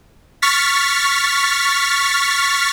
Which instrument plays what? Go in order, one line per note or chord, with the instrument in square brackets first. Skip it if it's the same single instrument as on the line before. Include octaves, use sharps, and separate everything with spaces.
[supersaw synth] C#6 F6 A6 B6